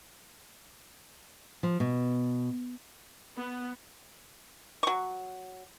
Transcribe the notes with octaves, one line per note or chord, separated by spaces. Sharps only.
F3
B2
B3
F#3 C#6